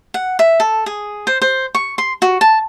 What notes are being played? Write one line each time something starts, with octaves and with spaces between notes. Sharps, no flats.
F#5
E5
A4
G#4
C5
C5
C#6
C6
F#4
A5